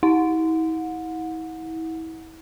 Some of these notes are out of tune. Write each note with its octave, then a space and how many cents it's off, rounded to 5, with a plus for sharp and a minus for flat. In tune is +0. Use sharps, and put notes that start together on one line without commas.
E4 -40 F#5 -30